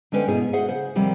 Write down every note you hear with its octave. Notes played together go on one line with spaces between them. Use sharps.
D3 G#3 C#4 B4 C5 G5
G#2 B2 C#4 E4 G#4
F#4 G#4 C5 E5 F#5
C#3 C5 F#5
D#2 C3 F3 G3 A#3